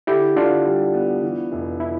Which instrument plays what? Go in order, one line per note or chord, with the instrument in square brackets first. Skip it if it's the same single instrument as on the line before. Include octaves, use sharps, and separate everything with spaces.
[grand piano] D3 [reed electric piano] E4 G4
[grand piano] D3 [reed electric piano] D4 F4
[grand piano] G3
B3
E3
F1
[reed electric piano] E4